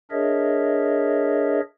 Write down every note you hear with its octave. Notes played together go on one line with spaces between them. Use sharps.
D4 G#4 A#4 C#5 D#5 E5